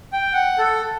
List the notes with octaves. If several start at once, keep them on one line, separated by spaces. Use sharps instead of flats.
G5
F#5
A4